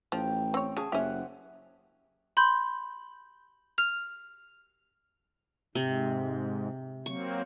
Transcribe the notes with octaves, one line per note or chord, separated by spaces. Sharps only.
A1 F3 G5
C4 C#5
C#3 G#4 A5
F#1 C#4 G4 C5 E5 F#5
B5 C6 G6
F6 F7
G#2 C3
F#3 A#3 C4 C#6